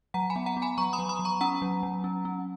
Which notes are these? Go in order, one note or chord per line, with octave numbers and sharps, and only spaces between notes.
F#3 F#5 A#5
G#5 B5
B3
F#5 A#5
B3
G#5 B5
F#3 A#5 C#6
B5 D#6
F#3
B5 D#6
F#3
A#5 C#6
C#4 F#5 A#5
F#3
F#3
C#4
C#4